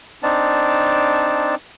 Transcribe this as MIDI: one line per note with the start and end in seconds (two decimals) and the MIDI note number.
0.23 1.55 60
0.23 1.55 62
0.23 1.55 63
0.23 1.55 81